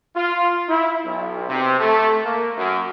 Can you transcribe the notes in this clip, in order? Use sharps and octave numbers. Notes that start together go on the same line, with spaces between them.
F4
E4
B1
C3
A3
A#3
F#2